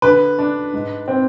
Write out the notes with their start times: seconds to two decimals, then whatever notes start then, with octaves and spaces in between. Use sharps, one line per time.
0.02 D3 B4
0.39 D4
0.73 G#2
1.08 C4